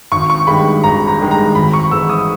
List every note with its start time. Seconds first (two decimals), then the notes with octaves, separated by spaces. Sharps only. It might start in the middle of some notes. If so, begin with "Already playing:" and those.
0.12 G#1 C#6
0.30 C#6
0.47 G2 D#3 G#3 B5
0.83 G#1 A#5
1.07 A#5
1.19 G2 D#3 G#3
1.31 A#5
1.55 G#1 B5
1.73 C#6
1.91 G#2 E3 G#3 E6
2.09 D#6